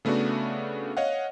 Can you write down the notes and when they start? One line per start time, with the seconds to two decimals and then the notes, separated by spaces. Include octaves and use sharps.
0.05 C#3 A3 B3 D4 F#4
0.97 C#5 D#5 F5 F#5